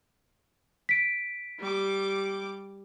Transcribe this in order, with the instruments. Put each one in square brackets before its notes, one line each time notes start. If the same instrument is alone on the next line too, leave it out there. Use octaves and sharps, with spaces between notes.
[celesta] B6 D7
[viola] G3 D6